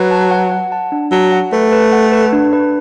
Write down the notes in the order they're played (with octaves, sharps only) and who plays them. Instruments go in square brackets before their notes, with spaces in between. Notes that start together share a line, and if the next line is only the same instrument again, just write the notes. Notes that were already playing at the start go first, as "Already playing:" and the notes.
Already playing: [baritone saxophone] F#3 [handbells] B4
[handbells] A5
F#5
F#5
A5
D4
[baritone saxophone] F#3 [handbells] A5
[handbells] F#5
[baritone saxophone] A3 [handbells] B4
[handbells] B4
F#5
B4
D4
B4